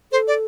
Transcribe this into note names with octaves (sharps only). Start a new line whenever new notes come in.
A4 C5
D5